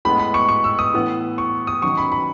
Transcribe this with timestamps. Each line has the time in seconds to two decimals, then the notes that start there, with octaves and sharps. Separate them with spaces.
0.05 A2 G#3 B3 B5
0.19 B5
0.34 C#6
0.49 C#6
0.64 E6
0.79 D#6
0.94 A2 E3 B3
1.38 C#6
1.67 D#6
1.82 D#3 F#3 C#4 C#6
1.98 B5
2.12 B5